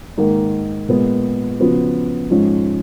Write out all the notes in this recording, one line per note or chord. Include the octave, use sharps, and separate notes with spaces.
G#2 D#3 A#3
A#2 G#3 B3
C#3 F3 B3 F#4
G#2 F3 G#3 C#4